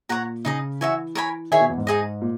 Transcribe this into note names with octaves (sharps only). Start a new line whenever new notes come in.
A#2 C#5 F#5 A#5
C#3 D#4 G#4 D#5
E3 F#4 C#5 E5 G#5
A#4 C#5 G#5 B5
D#3 G#4 C#5 E5 G#5
B2
E2
G#2
D#4 G#4 D#5
A#2